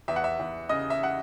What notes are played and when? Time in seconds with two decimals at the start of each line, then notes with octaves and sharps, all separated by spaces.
0.08 E2 E5
0.16 F#5
0.24 E5
0.39 E2
0.69 C#3 D#5
0.90 E5
1.03 F#5